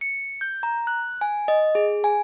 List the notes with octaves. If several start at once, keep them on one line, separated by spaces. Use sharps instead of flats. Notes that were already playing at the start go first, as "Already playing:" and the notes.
C#7
G6
A#5
F#6
G#5
D#5
G#4
G#5